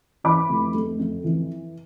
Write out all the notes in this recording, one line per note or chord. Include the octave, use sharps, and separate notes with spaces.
E3 B5 D6
F1
A3
F2
E3